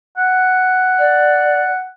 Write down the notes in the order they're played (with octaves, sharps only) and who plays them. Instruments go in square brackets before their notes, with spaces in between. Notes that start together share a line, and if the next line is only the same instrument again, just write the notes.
[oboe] F#5
[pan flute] D5